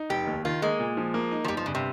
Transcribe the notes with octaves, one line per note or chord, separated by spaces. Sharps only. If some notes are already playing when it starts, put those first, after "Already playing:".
Already playing: D#4
F1 G4
D#2
D#3 F4
G#3 A#3
A#2
F3
A#3
D#4
F3
G1 G3
F3
G2 C#3
C3